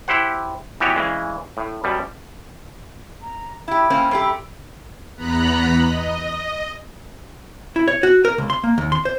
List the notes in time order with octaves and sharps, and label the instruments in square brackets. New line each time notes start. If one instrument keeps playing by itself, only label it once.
[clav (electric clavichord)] E4 G4 C5 F#5
E3 B3 F#4 G4 C#5
C#3 E3 G#3
A2
F#2 B2 G3
[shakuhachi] A#5
[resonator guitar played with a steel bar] E4 G4 [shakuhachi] B5
[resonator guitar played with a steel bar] A#3 C4 C#4
F#2 A3 G4
[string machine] E2 B3 A#5 B5 F#6
D#5
[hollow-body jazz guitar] E4
C#5
F#4
A#4
C#2
C6
A#3
D#2
C6
C5